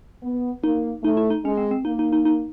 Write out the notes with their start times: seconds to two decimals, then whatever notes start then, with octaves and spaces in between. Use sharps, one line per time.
0.23 B3
0.64 A#3 D#4
1.03 A3 D#4
1.17 E4
1.30 D#4
1.45 G#3 C#4
1.58 C4
1.71 C4
1.85 A#3 D#4
1.99 D#4
2.13 D#4
2.25 D#4